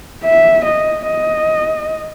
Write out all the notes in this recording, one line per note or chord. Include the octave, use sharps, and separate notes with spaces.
E5
D#5
D#5